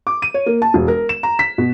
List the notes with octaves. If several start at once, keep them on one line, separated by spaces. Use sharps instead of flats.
D6
D#7
C#5
A#3
A5
E1
A#4
E7
A#5
B6
B2